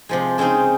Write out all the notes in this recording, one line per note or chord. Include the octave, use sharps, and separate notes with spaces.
C3 F3 G#3
C#3 G#3 C4 D#4